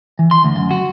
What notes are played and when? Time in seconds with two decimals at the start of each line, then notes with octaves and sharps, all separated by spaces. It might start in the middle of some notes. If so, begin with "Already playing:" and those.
0.19 E3
0.31 C6
0.44 D2
0.57 F#2
0.71 F#4